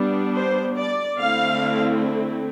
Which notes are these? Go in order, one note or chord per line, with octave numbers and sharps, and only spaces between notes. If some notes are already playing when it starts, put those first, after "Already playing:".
Already playing: G3 B3 D4
C5
D5
D3 A3 C4 E4 F5